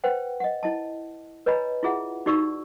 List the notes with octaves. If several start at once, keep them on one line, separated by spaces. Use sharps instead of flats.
B4 C5 F#5 G5
D#5 F#5
E4 D#5 A5
B4 C#5 D#5 G#5 A#5 B5
E4 F4 G#4 E5 F#5
D#4 F#4 G4 D5 C#6 E6